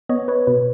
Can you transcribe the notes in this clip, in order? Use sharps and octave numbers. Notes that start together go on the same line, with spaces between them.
B3 C#5 D#5
B4 C#5
B2 B4